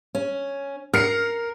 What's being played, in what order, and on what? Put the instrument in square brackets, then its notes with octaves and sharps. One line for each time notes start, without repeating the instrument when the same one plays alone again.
[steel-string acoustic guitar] C#4
[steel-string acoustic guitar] A#4 [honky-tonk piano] F6 C7 C#7